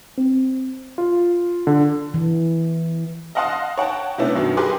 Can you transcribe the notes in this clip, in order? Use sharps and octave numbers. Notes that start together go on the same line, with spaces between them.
C4
F4
D3
E3
D#5 F5 F#5 A5 C6 D#6
C#5 F#5 G5 A5
C3 A3 B3 C#4 D4 E4
F#2 B2 D#3 F#3
G4 G#4 A#4 B4 C6 D6